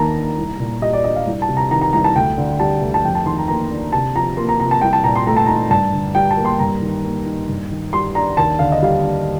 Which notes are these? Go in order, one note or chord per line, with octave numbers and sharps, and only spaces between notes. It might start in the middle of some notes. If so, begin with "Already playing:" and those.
Already playing: D#2 D#3 A#3 A5 A#5
D4
C2
A#2
G3 D#5
D5
D4 D#5
F5
C2
A5
C3
A#5
D#3 A#5
A#5
C2 A#5
A5
D2 G5
D3
G3 A5
D2
A5
F2 G5
A5
D#3 C6
A#5
A#3 A#5
D4
C3 A5
F3 A#5
A#3 C6
A#5
C3 A#5
A5
C2 G5
A5
A#2 A#5
C6
A3 A#5
A5
D#4 A#5
G2 A5
D3
G3 G5
A5
A#3
C6
G2 A#5
D#3
A#3
D#4
G2
D#3
G3 C6
D4 A#5
D#2 A5
D3 F5
D#5
G3 F5
D4